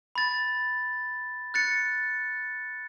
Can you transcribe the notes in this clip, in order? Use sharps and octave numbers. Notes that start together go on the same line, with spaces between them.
B5 A6
F#6 A6 C#7